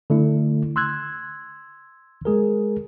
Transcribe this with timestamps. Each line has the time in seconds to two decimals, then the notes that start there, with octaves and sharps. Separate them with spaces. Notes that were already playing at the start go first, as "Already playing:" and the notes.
0.10 D3 A3 E4
0.76 C6 E6 F#6 G#6
2.25 G#3 G#4 A#4